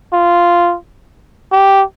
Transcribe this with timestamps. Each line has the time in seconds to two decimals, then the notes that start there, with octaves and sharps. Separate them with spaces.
0.13 F4
1.52 G4